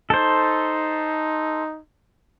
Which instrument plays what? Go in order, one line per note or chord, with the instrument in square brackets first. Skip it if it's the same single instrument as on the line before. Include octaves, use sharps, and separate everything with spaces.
[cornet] D#4 [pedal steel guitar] A4 C5